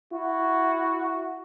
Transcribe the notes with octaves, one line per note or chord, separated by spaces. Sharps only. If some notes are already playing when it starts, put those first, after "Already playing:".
E4 F#4